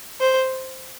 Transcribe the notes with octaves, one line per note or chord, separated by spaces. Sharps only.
C5